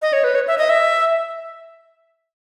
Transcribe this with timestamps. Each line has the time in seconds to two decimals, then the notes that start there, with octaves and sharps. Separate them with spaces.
0.02 D#5
0.13 C#5
0.24 B4
0.35 C#5
0.48 E5
0.58 D#5
0.70 E5